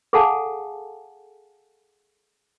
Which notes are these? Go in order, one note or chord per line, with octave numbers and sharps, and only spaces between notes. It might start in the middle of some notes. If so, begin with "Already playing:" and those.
G#4 A4 F5 F#5 G#5 A5